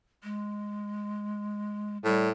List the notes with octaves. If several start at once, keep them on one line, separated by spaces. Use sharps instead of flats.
G#3
A2 G3